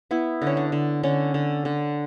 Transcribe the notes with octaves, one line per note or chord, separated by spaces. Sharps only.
B3 E4
D3
C#4
D4
D3
D3 C#4
D3
D3